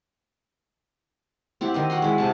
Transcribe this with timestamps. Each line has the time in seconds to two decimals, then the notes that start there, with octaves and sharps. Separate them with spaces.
1.61 C4 E4 G4 F#5
1.74 D#3 C4 D#5
1.90 F#4 F#5 G5 C6
2.02 G#3 E4
2.18 C3 A5